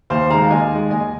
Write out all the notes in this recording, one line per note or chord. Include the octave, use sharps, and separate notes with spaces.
D#2 C5 F5
D#3 G#3 F5 A#5
D#2 D#5 G#5
D#3 G#3
D#2 D#5 G#5